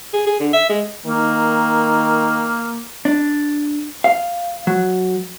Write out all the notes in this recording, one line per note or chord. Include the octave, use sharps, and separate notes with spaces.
G#4
G#4
D3
E5
G#3
D#3 A#3
D4
F5
F#3